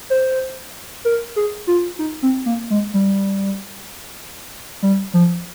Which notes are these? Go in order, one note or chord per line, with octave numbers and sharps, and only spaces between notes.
C5
A#4
G#4
F4
D#4
C4
A#3
G#3
G3
G3
F3